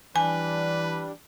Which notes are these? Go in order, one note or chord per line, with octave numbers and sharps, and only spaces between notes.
E3 G3 D4 B4 G#5